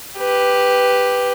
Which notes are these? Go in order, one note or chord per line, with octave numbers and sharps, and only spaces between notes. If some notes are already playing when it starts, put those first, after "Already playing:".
G4 B4